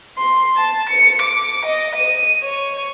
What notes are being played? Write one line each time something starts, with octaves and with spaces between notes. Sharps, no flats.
C6
A5
C#7
D6
D#5
D#7
C#5